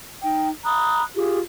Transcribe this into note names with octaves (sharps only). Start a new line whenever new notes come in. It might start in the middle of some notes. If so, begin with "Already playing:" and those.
D#4 G5
A#5 B5 D#6 F#6
F4 G4 G#4